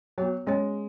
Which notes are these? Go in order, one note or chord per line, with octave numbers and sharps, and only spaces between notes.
F#3 B3 F#4 C#5
G#3 C#4 G#4 C#5